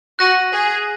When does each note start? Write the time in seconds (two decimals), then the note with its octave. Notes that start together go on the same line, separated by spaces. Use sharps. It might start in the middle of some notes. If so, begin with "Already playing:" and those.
0.19 F#4 F#6 A#6 D#7 F#7
0.52 G#4